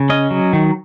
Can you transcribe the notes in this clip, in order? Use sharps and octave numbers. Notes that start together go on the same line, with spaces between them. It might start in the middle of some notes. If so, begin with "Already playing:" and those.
Already playing: C#3
C#4 D#5
F#3
D#3